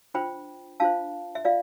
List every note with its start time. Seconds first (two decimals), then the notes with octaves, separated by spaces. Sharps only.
0.14 D4 F4 C5 G5 B5
0.80 D4 F4 C5 F5 A5
1.35 E5
1.45 F4 D5 F5